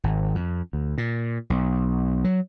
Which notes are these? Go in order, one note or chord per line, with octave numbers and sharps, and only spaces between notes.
G#1
F2
D2
A#2
B1
F#3